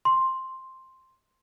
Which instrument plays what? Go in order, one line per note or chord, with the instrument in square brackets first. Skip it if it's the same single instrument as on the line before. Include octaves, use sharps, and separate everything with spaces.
[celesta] C6